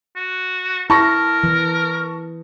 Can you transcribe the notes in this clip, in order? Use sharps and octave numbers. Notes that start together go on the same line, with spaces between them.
F#4
E4 A#4 A5 C#6 A#6
E3